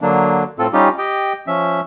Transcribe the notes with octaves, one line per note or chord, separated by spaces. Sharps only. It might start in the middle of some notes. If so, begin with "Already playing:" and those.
D3 F#3 A#3 D4
A2 C4 F4 A4
G3 C#4 D#4 F4 G4
G4 D#5 G5
F3 C#4 E5